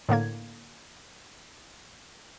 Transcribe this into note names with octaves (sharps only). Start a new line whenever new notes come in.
A2 D3 A#3 G#6